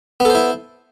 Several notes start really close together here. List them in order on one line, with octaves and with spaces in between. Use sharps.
B3 A4 C5 E4